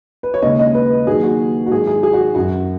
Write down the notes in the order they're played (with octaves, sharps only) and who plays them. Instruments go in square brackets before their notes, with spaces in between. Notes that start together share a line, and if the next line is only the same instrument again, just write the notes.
[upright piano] B4
C#5
D#2 C#3 G#3 D#5
D#5
B4
D#2 D#3 F#3 G#4
F#4
F#4
G#2 D#3 F#3 G#4
G#4
G#4
F#4
F#2 F#3 F#4